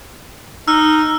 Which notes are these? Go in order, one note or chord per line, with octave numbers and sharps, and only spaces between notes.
D#4 E6 F6